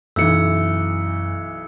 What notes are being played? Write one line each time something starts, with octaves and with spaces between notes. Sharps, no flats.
B1 F#2 E3 E6 C#7